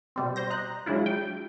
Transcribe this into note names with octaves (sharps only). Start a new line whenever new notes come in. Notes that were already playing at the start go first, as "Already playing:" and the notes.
B2 G3 C4
C5 G6 A#6
D#5 A#5 F#6
F#3 G#3 D4 E4 F4
G5